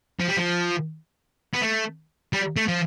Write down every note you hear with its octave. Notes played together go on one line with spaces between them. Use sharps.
F3
G3
F3
B3
A3
G3
A3
F3